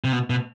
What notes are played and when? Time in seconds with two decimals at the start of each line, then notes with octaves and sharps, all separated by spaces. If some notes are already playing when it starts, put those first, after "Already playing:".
0.04 C3
0.13 B2
0.30 B2